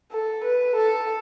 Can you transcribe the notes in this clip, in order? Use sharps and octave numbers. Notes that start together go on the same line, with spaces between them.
A4
B4
A4